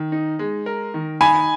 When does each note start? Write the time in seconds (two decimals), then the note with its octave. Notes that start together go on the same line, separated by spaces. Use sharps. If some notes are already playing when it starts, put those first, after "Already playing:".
Already playing: D#3
0.12 D#4
0.39 G#3
0.66 A#4
0.94 D#3
1.21 D#4 G#5 B5